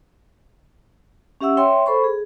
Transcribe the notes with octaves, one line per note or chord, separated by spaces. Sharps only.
C#4 G4 E5 F#5 E6
C#5 E5 G5 C6
A4 C5 B5 C#6
G#4